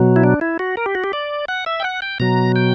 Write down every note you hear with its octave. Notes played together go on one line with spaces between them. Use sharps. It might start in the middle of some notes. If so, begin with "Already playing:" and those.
Already playing: B2 F#3
E4
D4
E4
F#4
A#4
G4
F#4
G4
D5
F#5
E5
G5
F#5
G5
B2 F#3 A#5
G5